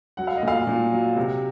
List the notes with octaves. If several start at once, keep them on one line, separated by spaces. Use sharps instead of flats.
F#3 F#5
F5
D#5
A#2 F5
A#2
F#3
C3